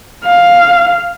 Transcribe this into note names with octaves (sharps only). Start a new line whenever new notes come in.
F5